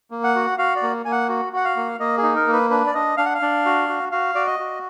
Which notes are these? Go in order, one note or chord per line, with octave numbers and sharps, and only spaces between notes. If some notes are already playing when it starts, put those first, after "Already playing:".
A#3
F#5
F#4
F#4 F5
D5
A#3
A#3 G#5
F#5
F#4
F#4 F#5
F5
A#3
A#3 D#5
G#4
D#4
A#4
A#3
B4
D4 B4
D5
D4 D#5
D4 F5
F#5
F5
D4
F#4
F#4
F#4 F5
F#4 D5
D#5
F#4